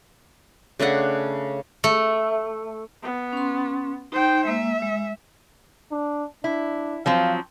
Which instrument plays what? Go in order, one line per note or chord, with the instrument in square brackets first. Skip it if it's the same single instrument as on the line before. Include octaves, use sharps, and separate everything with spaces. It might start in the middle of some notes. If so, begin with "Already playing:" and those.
[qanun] C#3 A3 D4 F#5
[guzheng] A3
[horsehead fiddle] B3
[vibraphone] C#4 C6
[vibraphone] D#4 [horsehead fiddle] C5 G5
[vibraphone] G#3 A#3 [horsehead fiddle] E5
[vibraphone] G#3
[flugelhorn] D4
[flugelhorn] D4 [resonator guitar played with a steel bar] E4
[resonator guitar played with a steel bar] F3 F#3 C4 [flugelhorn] F5